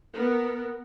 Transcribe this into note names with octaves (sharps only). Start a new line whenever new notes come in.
B3 A#4